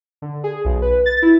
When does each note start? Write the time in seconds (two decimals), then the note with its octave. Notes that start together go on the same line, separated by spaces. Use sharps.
0.22 D3
0.44 G#4
0.65 B1
0.82 B4
1.06 A6
1.22 E4